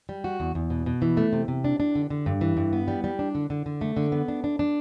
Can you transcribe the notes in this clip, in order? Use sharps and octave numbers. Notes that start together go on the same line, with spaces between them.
G3
F#4
E2
E2
B2
B2
E3
A3
C3
C3
D4
D4
D3
D3
G2
E3
G2
B3
G3
G3
D4
D3
D3
D3
A3
D3
B3
D4
D4
D4